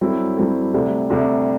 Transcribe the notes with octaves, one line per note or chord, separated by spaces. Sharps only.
G2 F#3 C4 E4 A4
G2 F#3 C4 E4 A4
D2 C3 G3 D4
D2 C3 G3 D4